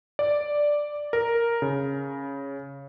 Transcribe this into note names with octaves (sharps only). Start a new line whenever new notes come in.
D5
A#4
C#3